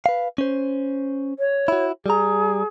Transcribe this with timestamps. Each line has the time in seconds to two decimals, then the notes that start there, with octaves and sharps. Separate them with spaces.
0.06 B4 F5
0.38 C#4 C5
1.39 C#5
1.68 E4 F#4
2.06 G3 G#4 A#5